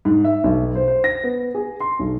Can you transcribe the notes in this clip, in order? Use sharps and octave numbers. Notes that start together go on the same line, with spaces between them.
G#2
E5
B1
C5
C5
A#6
B3
G#4
C6
B1